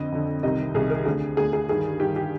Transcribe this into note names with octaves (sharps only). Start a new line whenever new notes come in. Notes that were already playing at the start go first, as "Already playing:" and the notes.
Already playing: F2 D3 D#5
F2 D3
C2 C3 D#3 D#5
C2 C3 D#3 G#4
A#4
D2 D3 G#4
D2 D3 G#4
G#4
G2 D#3 G#4
G2 D#3 G4
G4